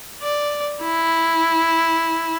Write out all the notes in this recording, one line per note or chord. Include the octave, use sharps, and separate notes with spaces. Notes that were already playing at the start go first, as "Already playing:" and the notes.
D5
E4